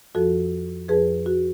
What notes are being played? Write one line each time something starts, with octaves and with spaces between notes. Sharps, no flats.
F2 F3 F#4 A4
F2 F3 G#4 B4
F#4